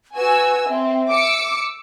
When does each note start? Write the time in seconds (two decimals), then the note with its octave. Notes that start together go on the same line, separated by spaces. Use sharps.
0.16 F#4 B4 G#5 E6
0.69 C4 E5
1.10 D6 E6 C#7